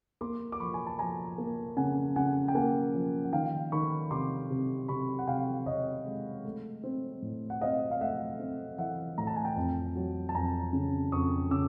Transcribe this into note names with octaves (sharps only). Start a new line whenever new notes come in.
A#3 C6 D6
D6
F3 B5 C#6
G#5
A5
F3 G#5 A#5
A#3
C#3 F#5 G#5
C#3 F#5 G#5
G5
A#3 F#5 G#5
F3
F#5
D#3 F5 G5
D#3 B5 C#6
C3 C6 D6
C3
C3 B5 C#6
F#5
C3 F5 G5
C3 C#5 D#5
G#3
A3
C4
A2
F#5
C4 D#5 F5
F5
A3 E5 F#5
C4
E3 E5 F#5
A2 A#5
A5
G#5
G5 A5
F2
F#3
A5
F2 G#5 A#5
C#3
F2 C#6 D#6
C#3 D6 E6